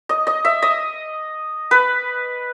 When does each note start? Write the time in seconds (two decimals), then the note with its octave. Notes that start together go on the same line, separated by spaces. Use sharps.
0.09 D#5
0.27 D#5
0.45 E5
0.62 D#5
1.71 B4